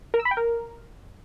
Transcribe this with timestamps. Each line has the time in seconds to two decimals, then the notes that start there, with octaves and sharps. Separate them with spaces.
0.14 A#4
0.20 E6
0.25 B5
0.31 G5
0.37 A#4